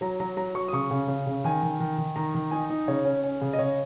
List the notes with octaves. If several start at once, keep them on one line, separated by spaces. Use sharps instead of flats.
F#3 A#5
F#3 A#5
F#3 A#5
F#3 C#6
D#6
C#3 C#6
C#3
C#3
C#3
D#3 G#5
D#3
D#3
D#3
D#3 A#5
D#3
D#4 G#5
D#4
C#3 C#5
C#4
C#4
C#3
D#5
C#3 C#5